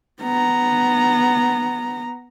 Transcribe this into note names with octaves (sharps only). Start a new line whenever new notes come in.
B3 A#5